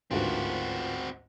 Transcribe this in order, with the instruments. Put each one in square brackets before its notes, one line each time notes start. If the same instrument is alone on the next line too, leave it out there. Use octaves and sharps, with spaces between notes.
[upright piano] A1 D2 G#2 [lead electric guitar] C4 F#4 [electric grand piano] F4 A#4 B4